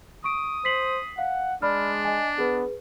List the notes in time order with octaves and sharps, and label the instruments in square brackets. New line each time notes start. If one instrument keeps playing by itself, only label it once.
[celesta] C#6 D7 [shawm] D#6
[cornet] C5 [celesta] B6 C7 F#7
[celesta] F5 [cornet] F#5
[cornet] G#3 [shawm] D4 [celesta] D5 B5 F6
[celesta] D#5 G#5
[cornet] B3 [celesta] G#4 B4